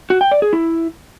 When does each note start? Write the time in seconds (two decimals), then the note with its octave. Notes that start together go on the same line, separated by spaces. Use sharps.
0.10 F#4
0.21 G5
0.31 D5
0.42 G#4
0.53 E4